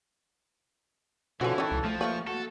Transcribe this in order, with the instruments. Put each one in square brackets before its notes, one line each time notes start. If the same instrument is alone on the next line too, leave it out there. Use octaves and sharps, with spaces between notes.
[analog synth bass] B2 [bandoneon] D3 F3 C#4 [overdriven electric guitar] E3 [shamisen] F#4 B4
[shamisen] D#3 C#5 [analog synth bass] C#4 [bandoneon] A4
[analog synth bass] C#2
[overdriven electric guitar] F3 [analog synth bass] A3
[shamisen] A3 F4 B4 [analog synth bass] A#3 [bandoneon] C#6
[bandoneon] F#4 [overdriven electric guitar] A4